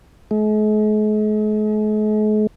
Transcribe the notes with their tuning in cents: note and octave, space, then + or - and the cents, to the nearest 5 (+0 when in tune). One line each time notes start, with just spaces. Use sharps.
G#3 +45